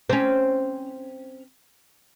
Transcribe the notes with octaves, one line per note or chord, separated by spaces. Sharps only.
C4 C#4